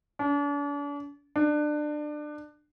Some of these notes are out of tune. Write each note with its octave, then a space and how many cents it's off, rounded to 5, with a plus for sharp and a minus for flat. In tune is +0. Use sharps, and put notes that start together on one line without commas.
D4 -40
D4 +25